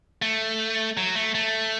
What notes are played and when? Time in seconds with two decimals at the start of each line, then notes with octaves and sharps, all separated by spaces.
0.22 A3
0.97 F#3
1.15 A3
1.35 A3